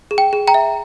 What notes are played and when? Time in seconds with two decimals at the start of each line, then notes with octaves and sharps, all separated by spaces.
0.11 G#4
0.18 G5
0.33 G#4
0.48 G5 A#5
0.54 E5